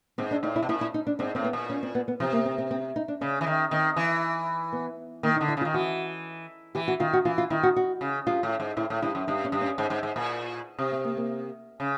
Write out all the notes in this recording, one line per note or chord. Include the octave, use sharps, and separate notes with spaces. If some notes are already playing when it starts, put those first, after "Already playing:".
G#2 C4
D4
A2 D#4
E4
B2
A#2 E4
E4
D#4
D4
G#2 C4
A2 C4
B3
A#2
C#4
C4
B3
B3
C3 F3
A#3
C4
C4
C4
D#4
D4
C#3 C#4
E3
D#3
D#3 C4
E3
B3
D#3 A#3
D#4
D3
E4
C#3
F4
D#3
E3 F#4
E3 G4
F#4
D#3 F4
F#4
E3 F4
F4
D#3 E4
F#4
F#4
C#3
G2 F4
A2
G#2
A2 E4
A2
G2 E4
F#2
G2 D#4
C#4
G2
C#4
G#2
G#2
G#2
A#2
C3
C4
A#3
A#3
C#3